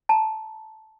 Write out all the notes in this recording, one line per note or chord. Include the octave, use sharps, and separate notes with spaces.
A5 A#5